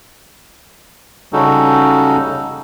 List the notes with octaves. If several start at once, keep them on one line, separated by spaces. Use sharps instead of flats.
C#3 G3 C#4 D#4 F#4 A4